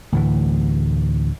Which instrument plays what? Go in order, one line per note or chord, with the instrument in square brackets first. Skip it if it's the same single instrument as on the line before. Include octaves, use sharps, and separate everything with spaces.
[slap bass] D2 A2 E3